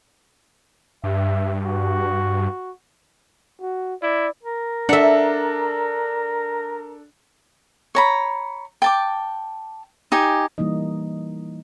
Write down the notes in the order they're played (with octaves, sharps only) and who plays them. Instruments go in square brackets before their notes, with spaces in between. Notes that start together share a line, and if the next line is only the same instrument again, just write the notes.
[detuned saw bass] G2 [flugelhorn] E5
[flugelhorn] F#4
F#4
[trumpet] E4 [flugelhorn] D5
[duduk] A#4
[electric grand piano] D4 A4 [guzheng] E5 F#5
[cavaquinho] C#5 A#5 B5
G5 A5 D6
D#4 G4 G#5
[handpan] E3 G3 A#3 D#4 D#5